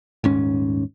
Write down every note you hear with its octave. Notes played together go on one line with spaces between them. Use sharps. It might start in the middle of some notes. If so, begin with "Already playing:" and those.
D#1 G#2 C#4